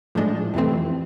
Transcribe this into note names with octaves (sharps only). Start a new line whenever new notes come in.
A2 F3 G#3 D4
F2 C3 E3 A3 C4